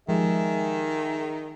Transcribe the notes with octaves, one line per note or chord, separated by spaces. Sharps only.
D#3 F3 G#3 G4 G#4 E5